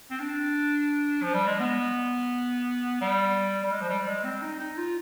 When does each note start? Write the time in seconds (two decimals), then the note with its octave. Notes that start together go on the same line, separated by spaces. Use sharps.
0.11 C4
0.20 D4
1.23 F3
1.34 G3
1.47 G#3
1.60 B3
3.01 G3
3.64 G3
3.72 G#3
3.81 F3
3.89 G3
4.07 G#3
4.24 C4
4.42 D#4
4.60 D#4
4.77 F4